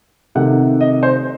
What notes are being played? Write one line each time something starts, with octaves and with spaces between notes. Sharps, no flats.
C3 D#3 A3 F#5
D#5
C5